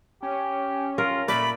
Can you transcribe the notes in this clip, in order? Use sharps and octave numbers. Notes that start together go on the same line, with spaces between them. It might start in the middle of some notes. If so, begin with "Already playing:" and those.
C#4 G4
F4 A#4
A#2 A3 D5 B5